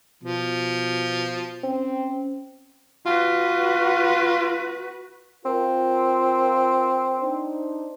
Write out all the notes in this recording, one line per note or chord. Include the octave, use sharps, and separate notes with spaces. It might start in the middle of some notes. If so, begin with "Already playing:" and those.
B2 F3
C4 C#4
F4 F#4 B4
C4 F4 A#4
D4 D#4 C5